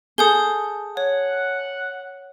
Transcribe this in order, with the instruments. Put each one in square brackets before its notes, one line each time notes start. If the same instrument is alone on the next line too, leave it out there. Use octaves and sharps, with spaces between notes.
[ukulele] G#4 A4 [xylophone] D#6 G6 G7
[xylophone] C#5 [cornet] F#5